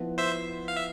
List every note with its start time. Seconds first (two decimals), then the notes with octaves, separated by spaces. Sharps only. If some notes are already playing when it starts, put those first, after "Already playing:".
Already playing: F3 B3 E4
0.18 C5 E5
0.68 F5
0.76 E5